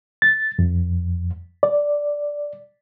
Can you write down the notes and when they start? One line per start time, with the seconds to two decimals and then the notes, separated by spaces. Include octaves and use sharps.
0.22 A6
0.59 F2
1.63 D5